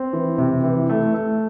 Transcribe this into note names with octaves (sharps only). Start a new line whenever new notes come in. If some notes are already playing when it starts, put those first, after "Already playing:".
Already playing: C4
E3
C3
E3
A3
A3